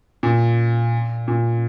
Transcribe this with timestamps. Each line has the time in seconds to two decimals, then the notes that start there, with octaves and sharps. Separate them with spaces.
0.23 A#2
1.28 A#2